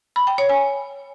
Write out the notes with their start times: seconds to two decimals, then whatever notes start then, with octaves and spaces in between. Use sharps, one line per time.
0.16 B5
0.27 G5
0.38 C#5
0.49 G#5